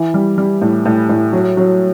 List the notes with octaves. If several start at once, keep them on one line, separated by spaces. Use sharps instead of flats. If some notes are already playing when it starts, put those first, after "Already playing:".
Already playing: E3
G3
G3
A2
A2
A2
F#3
F#3